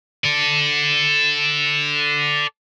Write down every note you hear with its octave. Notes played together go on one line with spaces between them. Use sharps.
A4 D5